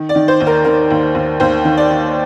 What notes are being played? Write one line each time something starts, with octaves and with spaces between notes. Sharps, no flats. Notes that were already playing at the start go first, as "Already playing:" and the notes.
Already playing: D#3
D5
D#3
C5
D#2
A#4
D#3 A#4
D#2
D#2
D#2 C5
D#3
D5
D#3